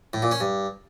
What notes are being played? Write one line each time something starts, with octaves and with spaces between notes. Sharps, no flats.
A2
A#2
C#4
G2